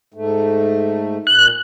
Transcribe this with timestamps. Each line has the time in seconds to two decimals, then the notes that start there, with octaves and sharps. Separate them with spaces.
0.14 G#2 A3
1.27 A#2 F#6